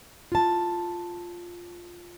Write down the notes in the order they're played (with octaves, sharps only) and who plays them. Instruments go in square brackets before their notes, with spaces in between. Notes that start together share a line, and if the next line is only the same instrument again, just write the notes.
[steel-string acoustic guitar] F4 A5